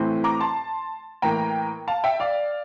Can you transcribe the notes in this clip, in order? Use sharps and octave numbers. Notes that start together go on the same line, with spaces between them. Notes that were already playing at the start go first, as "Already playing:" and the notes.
Already playing: A2 E3 A3 C4
A#5 D6
A5 C6
A2 E3 A#3 G5 A#5
F5 A5
E5 G5
D5 F5